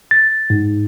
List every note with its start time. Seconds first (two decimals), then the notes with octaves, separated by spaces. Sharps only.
0.11 A6
0.50 G#2